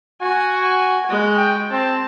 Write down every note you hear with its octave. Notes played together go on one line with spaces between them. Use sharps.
F#4 G#5
G#5
G#3 F#4
G5
C4 A5